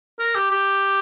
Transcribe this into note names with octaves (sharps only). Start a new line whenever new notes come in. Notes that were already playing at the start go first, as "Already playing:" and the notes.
A#4
G4
G4